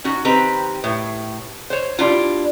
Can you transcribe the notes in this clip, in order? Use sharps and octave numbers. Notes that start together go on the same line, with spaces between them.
C#4 D#4 F#4
D#3 C4 G4 B4 A#5
A2
C5 C#5
G3 D4 E4 F4